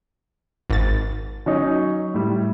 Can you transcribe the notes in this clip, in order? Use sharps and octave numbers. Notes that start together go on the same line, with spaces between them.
G#1 A6
F#3 C#4 D#4
A2 G3